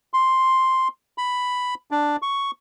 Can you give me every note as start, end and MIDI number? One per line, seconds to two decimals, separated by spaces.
0.14 0.88 84
1.18 1.75 83
1.91 2.16 62
2.22 2.51 85